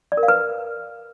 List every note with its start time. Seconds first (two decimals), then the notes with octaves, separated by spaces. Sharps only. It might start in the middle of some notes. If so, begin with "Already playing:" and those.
0.12 D5
0.17 A#4
0.23 F5
0.28 B4